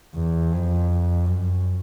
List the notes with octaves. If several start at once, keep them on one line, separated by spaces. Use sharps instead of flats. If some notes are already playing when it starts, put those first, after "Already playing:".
E2
F2
F#2